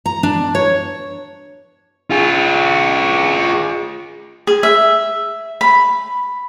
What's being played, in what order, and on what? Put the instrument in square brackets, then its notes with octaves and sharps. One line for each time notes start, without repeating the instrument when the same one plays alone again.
[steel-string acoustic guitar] A#5
D4
C#5
[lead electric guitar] F4 G#4
[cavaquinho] G#4
E5
B5